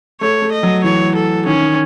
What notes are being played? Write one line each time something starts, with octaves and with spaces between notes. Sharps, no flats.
A3 C#5
A3
D#5
F#3
E3 C#5
A4
D#3 C#4
D#3